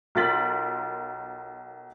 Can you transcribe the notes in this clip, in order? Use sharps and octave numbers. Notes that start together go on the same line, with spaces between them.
B1 F4 A#4 A6 B6 F#7